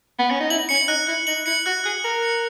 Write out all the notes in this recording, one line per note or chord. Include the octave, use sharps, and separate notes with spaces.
B3
C#4
D#4
E4 F#7
C#4 C#7
D#4 F#6
E4 F#6
D#4 F#7
E4 C#7
F#4 F#6
G#4 F#6
A#4 F#7
C#7